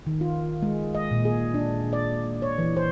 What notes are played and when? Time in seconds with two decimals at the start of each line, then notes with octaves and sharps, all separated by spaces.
0.07 D#3
0.21 F4
0.62 G#3
0.95 D#5
1.11 A#2
1.25 G#4
1.54 D4
1.93 D5
2.42 C#5
2.58 E3
2.77 C5